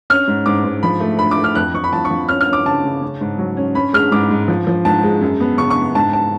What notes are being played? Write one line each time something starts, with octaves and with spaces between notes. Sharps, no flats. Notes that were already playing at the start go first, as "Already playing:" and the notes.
C#4 F6
G#2
G#2 D6
G#2
F3 B5
A3
A3 B5
D6
A3
F6
F2 F#6
F2 C#6
B5
F3 A5
C#6
F3
C#4 F6
F6
C#4
D6
C#3 A5
C#3
C#4
G#2
F#3
C#4
C#4 B5
G#3 F6
G#2 D6
G#2
F3
F3
G#2 A5
G#3
F#2
B3
C#3 C#6
C#6
G#3
G#2 A5
A5